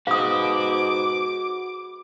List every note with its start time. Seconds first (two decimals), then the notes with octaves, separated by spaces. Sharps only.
0.07 G#2 F#4 B4 F5 D6 D#6